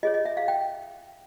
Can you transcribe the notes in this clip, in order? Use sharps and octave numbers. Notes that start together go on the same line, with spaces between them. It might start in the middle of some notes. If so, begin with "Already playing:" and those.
F4 G#4 C#5 D#5
D#5
E5
F5
G5